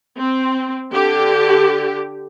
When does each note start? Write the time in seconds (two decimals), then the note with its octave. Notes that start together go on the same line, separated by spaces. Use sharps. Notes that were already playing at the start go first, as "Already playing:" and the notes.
0.18 C4
0.93 D3 G4